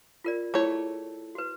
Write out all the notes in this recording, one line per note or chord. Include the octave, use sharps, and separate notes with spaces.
F4 A#4 D5
A3 E4 G#4 C#5
F#4 B4